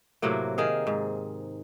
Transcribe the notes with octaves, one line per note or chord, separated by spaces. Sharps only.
A2 C3 F#3 A#3
D#3 G#4 F5
G#2